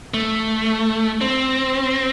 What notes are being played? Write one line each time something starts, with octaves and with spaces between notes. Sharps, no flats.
A3
C4